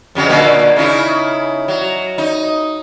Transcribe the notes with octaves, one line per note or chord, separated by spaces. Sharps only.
F2 C#3 F#3
A#2 D3 A#3
C#3 D#4 E4
F#3
D#4